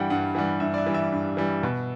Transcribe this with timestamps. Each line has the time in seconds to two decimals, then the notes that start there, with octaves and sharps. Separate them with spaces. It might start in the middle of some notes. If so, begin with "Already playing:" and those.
Already playing: G2 E3 G3 F#5 G5
0.10 G2 F#5
0.35 E3 G3 F#5
0.60 G2 E5
0.74 D5
0.78 E5
0.86 E3 G3
0.94 E5
1.12 G2
1.37 E3 G3
1.63 B2